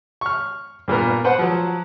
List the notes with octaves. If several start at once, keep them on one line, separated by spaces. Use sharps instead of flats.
C#6 F6
G2 A#2 B3 A#4
B4 C5 F#5
F3 F#3